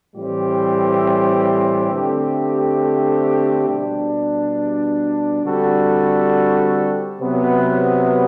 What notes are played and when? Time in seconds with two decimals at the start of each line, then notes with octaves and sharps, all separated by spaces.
0.15 A2 E3 G3 C4 G4
1.92 D3 A3 C4 G4
3.67 B2 G3 D4
5.44 D3 G3 C4 F#4 A4
7.20 C3 F#3 B3